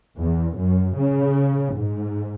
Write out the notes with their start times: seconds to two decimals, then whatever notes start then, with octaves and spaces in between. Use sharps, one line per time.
0.19 E2
0.59 F#2
0.97 C#3
1.75 G#2